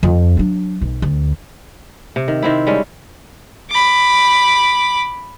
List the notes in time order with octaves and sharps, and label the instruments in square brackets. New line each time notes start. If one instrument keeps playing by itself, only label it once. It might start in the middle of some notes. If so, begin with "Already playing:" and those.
[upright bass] F2
F#3 D4
B1
D2
[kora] C3
D#3
D#3 C4 E4
G3 G#3 C#4
[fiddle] B5 D6